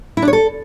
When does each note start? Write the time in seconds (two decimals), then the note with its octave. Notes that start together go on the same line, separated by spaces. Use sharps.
0.17 E4
0.22 D4
0.28 C#5
0.33 A4